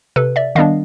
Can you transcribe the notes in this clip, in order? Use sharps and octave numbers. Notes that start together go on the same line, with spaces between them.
C3 A4 B4
D5 E5
D#3 G3 B3 D4 D#5 F5